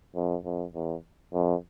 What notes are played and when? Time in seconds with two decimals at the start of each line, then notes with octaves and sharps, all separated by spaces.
0.15 F2
0.44 F2
0.74 E2
1.34 F2